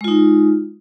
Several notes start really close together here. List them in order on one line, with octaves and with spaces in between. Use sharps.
G#3 F4 D#4